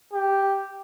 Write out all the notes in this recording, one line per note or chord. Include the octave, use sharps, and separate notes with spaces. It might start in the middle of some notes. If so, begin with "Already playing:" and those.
G4